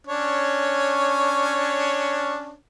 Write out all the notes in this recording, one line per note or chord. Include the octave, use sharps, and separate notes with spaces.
C#4 D4 C#5